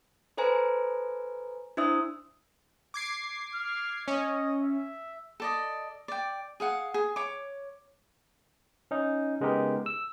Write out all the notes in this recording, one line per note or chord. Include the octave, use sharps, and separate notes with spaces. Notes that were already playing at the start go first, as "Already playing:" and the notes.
A4 B4 C5 G#5 A#5
D4 E4 C5 E5 D#6 E6
D6 G#6 C7
F6
C#4 D#5
E5
A4 D5 D#5
D5 G5
G#4 F5 F#5
G#4
C#5 D6
C#4 D#4
C#3 G#3 B3 D#4 G4 A#4
E6